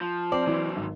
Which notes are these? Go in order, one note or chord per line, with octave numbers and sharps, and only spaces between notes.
F3
C4 C5 D5
C3 E3 F#3
G#1